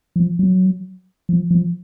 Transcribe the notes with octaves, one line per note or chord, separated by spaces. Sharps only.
F3
F#3
F3
F3